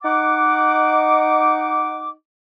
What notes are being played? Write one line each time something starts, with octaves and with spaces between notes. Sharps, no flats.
D#4 F#5 D6